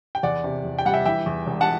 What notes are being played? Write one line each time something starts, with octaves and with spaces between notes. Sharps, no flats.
G5
E2 D5 F#5
C3
E2
G5
G3 F#5
E5 G5
E3 E5 G5
E2
E1
F#5 A5